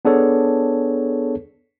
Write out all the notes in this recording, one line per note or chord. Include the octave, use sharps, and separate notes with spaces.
B3 D4 G#4 A4 C#5